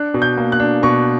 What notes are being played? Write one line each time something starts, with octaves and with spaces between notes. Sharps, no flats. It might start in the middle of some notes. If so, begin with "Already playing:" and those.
Already playing: D4 F#6
B2
G6
A#3
F#6
D4
B2 C#6